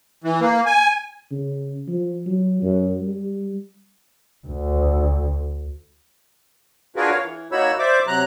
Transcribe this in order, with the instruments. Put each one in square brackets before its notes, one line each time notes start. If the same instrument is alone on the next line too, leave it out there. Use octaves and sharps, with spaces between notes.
[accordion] E3
A#3
G#5
[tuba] C#3
F3
F#3
F#2
G3
[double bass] D2
[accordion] D4 F4 F#4 G#4 A#4 B4
C#5 F5
E3
A#3 D#4 F#4 C#5 B5 E6
C5 D5 E5 D6
C3 F#3 A#5 F#6